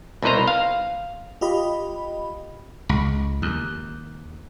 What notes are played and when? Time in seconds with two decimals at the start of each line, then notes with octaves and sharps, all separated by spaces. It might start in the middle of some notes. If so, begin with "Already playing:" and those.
0.22 C2 B2 D#4 B4 C5 A#5
0.47 F5
1.41 F4 G4 D#5 B5
2.89 C#2
3.42 D#2